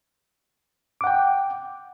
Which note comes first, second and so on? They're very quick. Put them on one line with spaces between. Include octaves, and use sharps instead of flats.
D6 F#5 G5